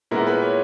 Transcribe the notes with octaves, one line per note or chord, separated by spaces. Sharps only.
A#2 G#3 B3 E4 A#4
B4
C#5